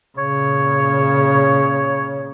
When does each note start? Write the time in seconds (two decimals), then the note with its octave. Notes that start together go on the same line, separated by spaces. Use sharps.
0.18 A#2 C#3 C#5